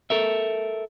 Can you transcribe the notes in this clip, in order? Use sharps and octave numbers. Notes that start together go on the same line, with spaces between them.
A4 A#4 E5